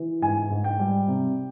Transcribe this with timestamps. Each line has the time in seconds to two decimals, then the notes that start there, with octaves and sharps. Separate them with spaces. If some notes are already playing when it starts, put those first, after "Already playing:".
Already playing: E3
0.22 G#2 G#5
0.50 G#2
0.64 G5
0.79 G3
1.08 C3